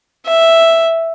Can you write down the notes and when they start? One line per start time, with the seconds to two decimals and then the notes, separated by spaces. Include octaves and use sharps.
0.26 E5